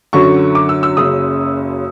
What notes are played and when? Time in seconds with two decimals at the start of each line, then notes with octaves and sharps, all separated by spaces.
0.13 F#2 D3 F#3 C#6
0.55 D6
0.69 E6
0.83 E6
0.97 F#1 F#2 C#3 D#6